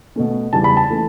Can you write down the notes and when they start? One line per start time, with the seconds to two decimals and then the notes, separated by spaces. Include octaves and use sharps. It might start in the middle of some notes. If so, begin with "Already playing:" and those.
0.16 B2 A3 C#4
0.53 E2 C#3 E3 G3 A5
0.64 B5
0.77 A5
0.91 E3 A3 C#4